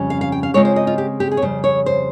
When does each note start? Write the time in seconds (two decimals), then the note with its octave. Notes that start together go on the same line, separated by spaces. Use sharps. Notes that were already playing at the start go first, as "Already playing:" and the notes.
Already playing: F2 C#3 G3 C#4
0.10 F5
0.21 F5
0.32 G5
0.43 F5
0.54 C#3 G#3 C4 F4 C#5
0.65 C5
0.76 D#5
0.87 F4
0.98 G4
1.20 G4
1.31 G#4
1.37 C#5
1.42 F2 C#3 G3 C5
1.64 C#5
1.86 C5